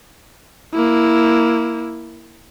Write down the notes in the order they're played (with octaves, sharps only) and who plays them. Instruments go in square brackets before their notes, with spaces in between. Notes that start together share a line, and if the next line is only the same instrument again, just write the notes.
[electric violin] A#3 E4